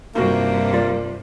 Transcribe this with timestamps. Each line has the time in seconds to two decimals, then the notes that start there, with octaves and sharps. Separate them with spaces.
0.15 G2 C3 A#3 D#4 F4 F#4
0.74 F4 D5